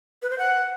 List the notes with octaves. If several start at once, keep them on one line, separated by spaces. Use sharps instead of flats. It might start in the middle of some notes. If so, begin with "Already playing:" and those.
B4
C5
F#5